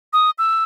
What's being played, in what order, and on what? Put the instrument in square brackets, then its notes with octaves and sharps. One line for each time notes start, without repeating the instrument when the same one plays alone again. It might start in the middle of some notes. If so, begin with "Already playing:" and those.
[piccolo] D#6
E6